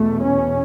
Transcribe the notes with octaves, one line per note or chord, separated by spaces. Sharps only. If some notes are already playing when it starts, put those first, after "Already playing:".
Already playing: E2 B2 A3
C#4